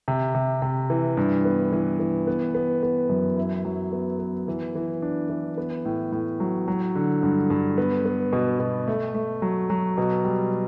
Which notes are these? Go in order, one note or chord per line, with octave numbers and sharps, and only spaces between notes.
C3
C3
C3
E3
G2
B3
E3
E3
B3
B3
B3
F#2
E4
F#3
B3
B3
E3
E3
D4
E3
B3
A2
A2
F#3
F#3
D3
G2
G2
B3
B3
B2
B2
A3
A3
F#3
F#3
B2
G3